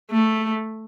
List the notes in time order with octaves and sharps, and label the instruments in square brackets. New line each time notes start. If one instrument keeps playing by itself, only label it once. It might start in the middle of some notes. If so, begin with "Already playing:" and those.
[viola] A3